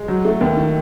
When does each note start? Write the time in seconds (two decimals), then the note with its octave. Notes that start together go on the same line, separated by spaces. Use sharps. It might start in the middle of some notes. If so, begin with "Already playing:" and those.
Already playing: G#3
0.08 F#3
0.25 A3
0.41 D#2
0.57 D#3